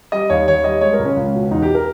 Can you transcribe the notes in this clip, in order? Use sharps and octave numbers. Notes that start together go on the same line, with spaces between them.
G3 D#5
D#2 C#5
D#2 C#5
G3 D#5
G#3 C#5
A#4
C#2
C#4
C#2
B2
E2 D#4
G4
A#4